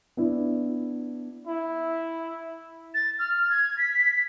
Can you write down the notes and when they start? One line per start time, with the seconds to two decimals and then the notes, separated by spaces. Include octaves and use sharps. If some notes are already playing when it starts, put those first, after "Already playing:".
0.17 B3 D4 E4
1.47 E4
2.94 A6
3.19 F6
3.50 G#6
3.78 B6